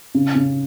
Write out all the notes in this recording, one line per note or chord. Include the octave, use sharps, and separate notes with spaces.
C#3
C#3